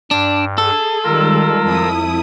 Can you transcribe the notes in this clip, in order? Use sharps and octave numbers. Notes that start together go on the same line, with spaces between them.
G2 D4
G#4 A4
D#3 G3 G#3 F4 A#4 E6
F2 E4 D#6